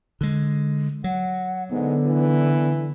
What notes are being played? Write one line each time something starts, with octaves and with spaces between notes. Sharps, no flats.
D3 G#3
F#3 F#5
G#2 D3 B3
E3